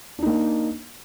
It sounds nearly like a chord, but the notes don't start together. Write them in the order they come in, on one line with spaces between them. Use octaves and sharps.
D4 D#4 A#3